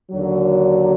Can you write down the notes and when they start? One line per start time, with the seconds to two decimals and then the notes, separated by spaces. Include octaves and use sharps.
0.12 D#2 D3 F#3